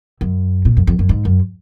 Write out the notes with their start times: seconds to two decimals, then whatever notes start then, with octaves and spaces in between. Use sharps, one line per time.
0.21 F#2
0.65 A#2
0.77 F#2
0.87 F2
0.99 F#2
1.09 G#2
1.25 F#2